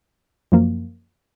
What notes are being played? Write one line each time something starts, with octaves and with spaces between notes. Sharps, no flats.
F#2 F3 A#3